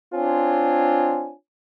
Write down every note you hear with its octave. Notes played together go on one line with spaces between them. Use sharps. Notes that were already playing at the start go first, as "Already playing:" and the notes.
C4 D4 F4 C#5 G#5